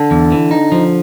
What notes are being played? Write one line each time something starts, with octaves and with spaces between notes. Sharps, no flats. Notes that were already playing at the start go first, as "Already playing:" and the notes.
Already playing: D3
E2
E3
D#4
F3